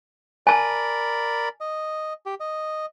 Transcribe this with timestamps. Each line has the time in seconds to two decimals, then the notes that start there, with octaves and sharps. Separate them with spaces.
0.47 A#4 D5 G#5 A5 B5
1.61 D#5
2.26 G4
2.40 D#5